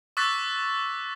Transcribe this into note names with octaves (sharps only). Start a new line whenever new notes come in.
C#6 D6 E6 F#6 A6 B6